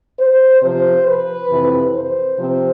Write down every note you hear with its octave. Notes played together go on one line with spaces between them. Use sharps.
C5
C3 F3 C4 C5
B4
F2 C3 E3
C5
C3 F3 C4